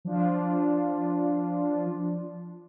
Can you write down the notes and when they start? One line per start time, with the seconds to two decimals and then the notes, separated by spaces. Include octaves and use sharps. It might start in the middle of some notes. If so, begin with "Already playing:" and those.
0.05 F3 D4 F4